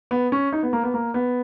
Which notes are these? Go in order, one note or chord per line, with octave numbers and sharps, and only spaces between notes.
B3
C#4
D#4
B3
A#3
B3
A#3
B3